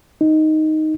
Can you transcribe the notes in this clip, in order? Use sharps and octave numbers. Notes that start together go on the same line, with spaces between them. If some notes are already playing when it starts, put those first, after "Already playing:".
D#4